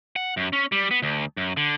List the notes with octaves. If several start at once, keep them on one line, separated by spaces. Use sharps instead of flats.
F#5
F#2
C#4
G3
B3
D2
F#2
D3